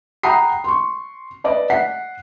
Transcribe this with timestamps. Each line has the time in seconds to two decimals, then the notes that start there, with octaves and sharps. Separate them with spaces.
0.23 F#5 G5 A#5 B5 D#6 C7
0.64 C6 C#6
1.44 B4 D5 D#5
1.70 F#5 B6 C7